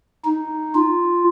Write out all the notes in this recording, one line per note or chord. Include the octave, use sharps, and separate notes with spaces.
D#4
F4